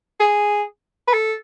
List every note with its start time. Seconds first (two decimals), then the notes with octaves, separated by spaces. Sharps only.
0.20 G#4
1.08 B4
1.13 A4